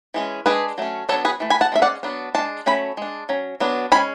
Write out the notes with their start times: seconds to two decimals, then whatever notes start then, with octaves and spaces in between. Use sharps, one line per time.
0.14 E3 G#3 C#4
0.46 G#3 D4 G#4 B4
0.78 F#3 A3 C#4
1.09 F#3 B3 D4 A4 C#5
1.25 G#4 B4
1.40 E3 A3
1.50 G#5 B5
1.61 F#5 A5
1.72 G#3 C#4 E5
1.82 D5 F#5
2.03 F#3 B3 D4
2.35 G#3 D4 A5
2.66 F#3 A3 C#4 B5
2.97 G#3 D4
3.29 F#3 C#4
3.60 F#3 B3 D4
3.92 G#3 C#4 G#5 B5